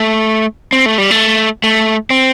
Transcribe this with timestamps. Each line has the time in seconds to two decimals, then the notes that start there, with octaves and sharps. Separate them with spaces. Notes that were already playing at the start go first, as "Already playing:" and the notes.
Already playing: A3
0.73 C4
0.86 A3
0.98 G3
1.11 A3
1.64 A3
2.10 C4